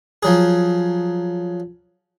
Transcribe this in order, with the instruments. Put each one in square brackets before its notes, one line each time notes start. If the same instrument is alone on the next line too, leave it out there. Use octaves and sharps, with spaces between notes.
[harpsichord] F3 F#3 G#4